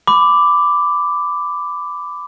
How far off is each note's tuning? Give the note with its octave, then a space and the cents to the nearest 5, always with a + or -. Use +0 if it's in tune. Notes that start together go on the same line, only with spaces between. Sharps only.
B5 +20 D6 +0